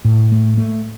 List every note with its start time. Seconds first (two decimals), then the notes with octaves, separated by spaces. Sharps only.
0.05 A2
0.32 A3
0.58 A3